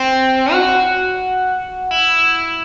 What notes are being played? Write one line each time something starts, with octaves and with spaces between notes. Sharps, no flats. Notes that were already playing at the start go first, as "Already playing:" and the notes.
Already playing: C4
F#4
E4